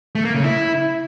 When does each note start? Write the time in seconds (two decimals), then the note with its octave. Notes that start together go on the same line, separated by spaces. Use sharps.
0.15 A3
0.25 A#3
0.35 C#3
0.44 E4